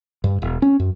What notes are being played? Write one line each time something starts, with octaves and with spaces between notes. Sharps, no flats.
G2
E1
C#4
F#2